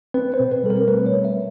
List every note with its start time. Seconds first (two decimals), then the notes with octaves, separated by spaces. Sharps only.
0.14 C4 B4
0.34 C5
0.40 B2
0.52 B4
0.63 G3 A4
0.70 A#4
0.88 A3 B4
1.06 C#5
1.13 C4
1.25 E5